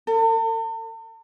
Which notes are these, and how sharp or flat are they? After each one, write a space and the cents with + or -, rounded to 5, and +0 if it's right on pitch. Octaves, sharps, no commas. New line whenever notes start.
A4 +45